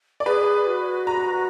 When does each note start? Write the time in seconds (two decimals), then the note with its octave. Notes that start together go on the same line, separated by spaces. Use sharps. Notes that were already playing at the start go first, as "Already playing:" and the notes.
0.20 D5
0.26 G#4 B4
0.67 F#4
1.07 A#5